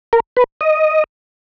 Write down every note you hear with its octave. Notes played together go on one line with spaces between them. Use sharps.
A#4
B4
D#5